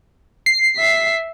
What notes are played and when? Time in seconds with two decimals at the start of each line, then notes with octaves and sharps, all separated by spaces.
0.46 C7
0.77 E5 B6